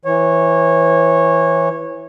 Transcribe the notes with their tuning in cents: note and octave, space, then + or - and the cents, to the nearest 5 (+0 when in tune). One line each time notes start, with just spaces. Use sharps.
E3 +0 C#5 -20